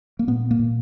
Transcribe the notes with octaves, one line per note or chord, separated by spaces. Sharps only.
A#3
A#2 B3
A#3
A#2